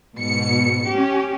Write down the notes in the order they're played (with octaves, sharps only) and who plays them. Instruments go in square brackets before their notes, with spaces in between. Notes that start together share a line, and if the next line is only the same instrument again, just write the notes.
[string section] G#2 B2 C#7
C#4 G4